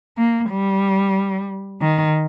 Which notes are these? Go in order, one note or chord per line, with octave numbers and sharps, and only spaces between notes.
A#3
G3
D#3